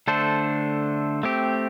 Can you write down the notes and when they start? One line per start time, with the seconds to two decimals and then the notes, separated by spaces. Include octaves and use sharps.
0.08 D3 A3 D4 A4 C5
1.23 A3 C4 G4